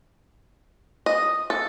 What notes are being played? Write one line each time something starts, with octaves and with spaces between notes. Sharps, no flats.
D#5
A4